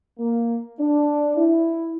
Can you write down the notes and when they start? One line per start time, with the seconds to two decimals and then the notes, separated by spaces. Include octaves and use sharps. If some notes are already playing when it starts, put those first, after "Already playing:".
0.19 A#3
0.80 D4
1.37 E4